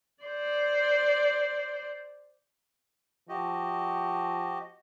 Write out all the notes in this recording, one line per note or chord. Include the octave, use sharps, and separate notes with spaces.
C5 D5
F3 F#4 G4 D#5